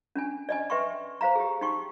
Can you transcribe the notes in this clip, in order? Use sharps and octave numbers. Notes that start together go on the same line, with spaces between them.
C#4 D4 G#5
D5 D#5 G#5
B4 E5 G5 C6 C#6
C5 F5 A#5
G4 G#4
D#4 G5 C6 C#6